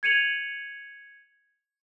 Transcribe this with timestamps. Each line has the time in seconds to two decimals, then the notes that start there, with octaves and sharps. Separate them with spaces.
0.03 G#6 C#7 D#7 F7 F#7